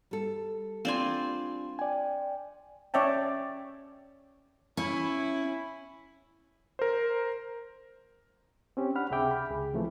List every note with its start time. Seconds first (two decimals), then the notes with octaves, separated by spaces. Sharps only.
0.11 G3 A4
0.85 C4 D4 F4 D5 F5 G#5 C6
1.79 D5 G5 G#5
2.94 C#4 C#5 D5 E5 G5 A5
4.77 C#4 E4
6.79 A#4 C5
8.77 C4 C#4 G4
8.95 D4 F#5 B5 F6
9.10 C#2 C3 G#4 E5 G5 D6
9.31 B5
9.51 C#2 G#4
9.74 C3 E3 F3 A3